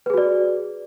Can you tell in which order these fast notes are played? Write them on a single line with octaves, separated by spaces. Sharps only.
B4 G#4 F#4 D5